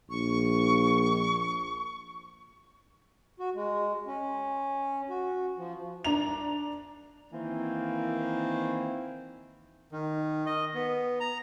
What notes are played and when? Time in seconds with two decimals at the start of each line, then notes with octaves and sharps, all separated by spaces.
0.10 A#1 C#6
3.40 F#4
3.55 G#3
4.07 C#4
5.10 F#4
5.58 F3
6.04 D4 A#5 F7
7.31 D#3 E3 A#3 C4
9.92 D#3
10.46 D#5
10.74 B3
11.20 A#5